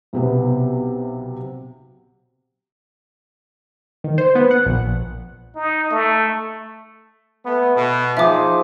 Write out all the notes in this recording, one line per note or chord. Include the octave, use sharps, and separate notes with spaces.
B1 C3 B3
D#3
C5
B3
F#5
A#1
D#4
A3
A3 B3
B2
F3 D#4 G#4 E5 D6